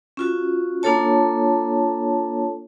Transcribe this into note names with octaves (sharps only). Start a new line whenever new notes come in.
C#4 F4 F#4
A#3 D4 F4 A4 C#5 A5